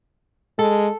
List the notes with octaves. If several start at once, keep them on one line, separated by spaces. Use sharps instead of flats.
G#3 A4